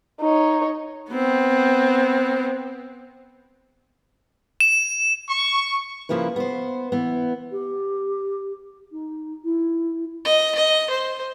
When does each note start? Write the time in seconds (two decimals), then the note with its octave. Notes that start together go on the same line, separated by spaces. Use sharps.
0.21 D#4 C#5
1.11 B3 C4
4.60 E7
5.29 C#6
6.09 C#3 F3 A#3 E4 B4
6.36 B3 C5
6.92 E3 B3
7.52 G4
8.92 D#4
9.44 E4
10.25 D#5
10.55 D#5
10.90 C5